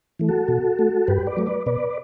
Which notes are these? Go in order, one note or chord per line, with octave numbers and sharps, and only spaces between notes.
E3 A3
F#4 A4
B2
A3
G2 G4 B4
B4 D5
F#3 A3
B4 D5
B2 B4 D5